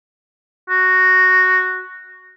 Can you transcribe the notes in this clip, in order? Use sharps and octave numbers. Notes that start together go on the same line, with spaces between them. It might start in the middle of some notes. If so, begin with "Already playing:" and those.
F#4